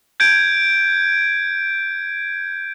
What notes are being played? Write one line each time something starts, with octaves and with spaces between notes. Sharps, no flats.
G6 G#6 D7